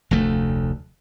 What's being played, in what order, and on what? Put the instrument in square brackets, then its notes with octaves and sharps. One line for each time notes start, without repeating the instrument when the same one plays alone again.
[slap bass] F1 D2 A3